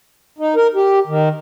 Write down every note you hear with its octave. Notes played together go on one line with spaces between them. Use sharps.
D#4
A#4
G4
D#3